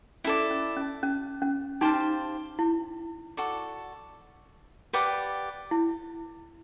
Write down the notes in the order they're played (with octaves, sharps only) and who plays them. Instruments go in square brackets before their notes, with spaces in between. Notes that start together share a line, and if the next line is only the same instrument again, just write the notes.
[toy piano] C#4 [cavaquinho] E4 A4 D5
[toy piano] C#4
C#4
C#4
C#4
[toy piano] D#4 [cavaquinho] G4 C5 F5 A5
[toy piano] E4
[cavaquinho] F#4 A4 D5
G4 B4 D5 F#5
[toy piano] E4